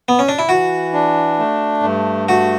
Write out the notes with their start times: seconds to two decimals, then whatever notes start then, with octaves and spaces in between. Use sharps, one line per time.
0.09 B3
0.19 C#4
0.29 D4
0.39 E4
0.49 E3 F#4
0.93 D4
1.39 A3
1.83 G2
2.29 A3 F#4